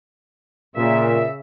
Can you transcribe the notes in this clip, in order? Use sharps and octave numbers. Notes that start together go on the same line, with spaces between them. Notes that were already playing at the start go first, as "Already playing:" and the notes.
A#2 C#3 E5